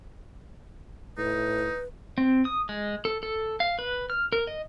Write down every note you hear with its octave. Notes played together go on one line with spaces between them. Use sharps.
A2 D#4 B4
C4
D#6
G#3
A4
A4
F5
B4
F6
A#4
D#5